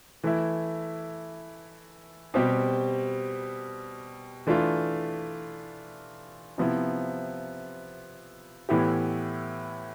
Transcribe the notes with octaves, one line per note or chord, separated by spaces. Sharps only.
E3 A3 E4
B2 G3 C4 G4
E3 A3 D4 F4
C3 F3 B3 E4
A2 E3 B3 E4 G4